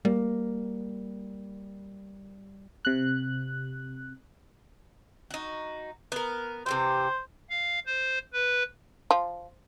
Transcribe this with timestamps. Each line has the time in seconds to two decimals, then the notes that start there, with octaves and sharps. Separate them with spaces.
0.05 G3 A#3
2.85 C3 F#6
5.31 D#4 F#4
6.12 B3 A#4
6.66 C3 E3 G4 C5
7.50 F5
7.86 C5
8.33 B4
9.11 F3